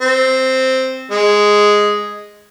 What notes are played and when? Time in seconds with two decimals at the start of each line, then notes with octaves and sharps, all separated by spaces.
0.01 C4
1.11 G#3